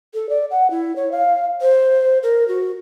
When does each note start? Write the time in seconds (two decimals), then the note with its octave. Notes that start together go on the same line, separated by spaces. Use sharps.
0.14 A4
0.29 D5
0.51 F#5
0.70 E4
0.96 C#5
1.12 F5
1.61 C5
2.23 A#4
2.48 F#4